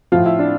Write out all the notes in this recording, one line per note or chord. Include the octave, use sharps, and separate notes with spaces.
A2 F3 F4
E4
D4